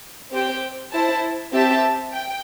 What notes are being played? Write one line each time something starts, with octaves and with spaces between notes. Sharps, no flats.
C4 G4 C5 G5
E4 C5 A5
C4 G4 E5 A5
G5